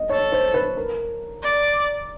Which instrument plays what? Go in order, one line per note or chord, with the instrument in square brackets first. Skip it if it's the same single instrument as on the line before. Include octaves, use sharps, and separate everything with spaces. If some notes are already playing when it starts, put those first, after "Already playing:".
Already playing: [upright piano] D#5
[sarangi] A4 [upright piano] C#5
[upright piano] C5
B4
A#4
[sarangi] D5